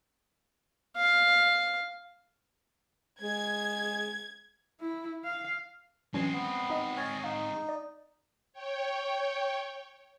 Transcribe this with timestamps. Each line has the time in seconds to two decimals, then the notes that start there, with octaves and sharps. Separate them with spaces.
0.97 F5
3.22 G#3 G#6
4.80 E4
5.24 F5
6.14 E3 F#3 G#3 C4 C#4 G#5
6.33 B3
6.70 D#4 D#5
6.97 C#5 D#5 G#5 F6 G#6 A6
7.24 D#4 F5 C7
7.69 D5
8.53 C#5 G5